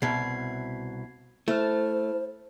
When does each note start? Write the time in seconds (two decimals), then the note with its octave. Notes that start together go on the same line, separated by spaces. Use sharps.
0.02 C2 B2 G#6 C7
1.48 A3 E4 C5 A5 F6